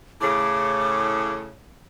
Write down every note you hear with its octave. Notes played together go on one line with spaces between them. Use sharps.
A2 C#3 D6